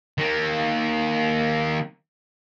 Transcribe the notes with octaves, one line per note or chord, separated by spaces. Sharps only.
D#3 A#3